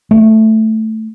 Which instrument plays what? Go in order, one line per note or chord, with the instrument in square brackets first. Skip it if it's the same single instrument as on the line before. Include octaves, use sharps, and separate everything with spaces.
[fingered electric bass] A3